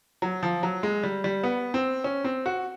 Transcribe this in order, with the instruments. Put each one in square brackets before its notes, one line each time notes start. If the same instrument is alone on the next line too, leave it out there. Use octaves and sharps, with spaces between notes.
[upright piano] F#3
F3
F#3
G#3
G3
G3
B3
C4
C#4
C4
F#4